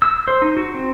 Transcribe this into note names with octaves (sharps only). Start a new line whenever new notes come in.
E6
C5
D#4
F#4
C4